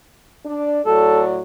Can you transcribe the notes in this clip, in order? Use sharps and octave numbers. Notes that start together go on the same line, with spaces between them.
D4 D5
A2 F#3 A4 D5